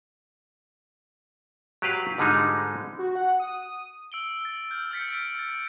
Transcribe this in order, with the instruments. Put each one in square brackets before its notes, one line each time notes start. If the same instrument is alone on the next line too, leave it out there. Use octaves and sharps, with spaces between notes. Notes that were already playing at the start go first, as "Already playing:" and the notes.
[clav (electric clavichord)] F#3 G4 B4 F5
G#2 D3 G3 G#3 D#4 F4
[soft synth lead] F#4
F#5
D#6
[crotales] E6 D7 G7
E6 A6
F6 G6
E6 G6 A6 B6 C#7
F6 D7
A6